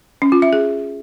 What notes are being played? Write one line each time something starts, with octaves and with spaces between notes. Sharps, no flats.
C#4
F4
E5
G#4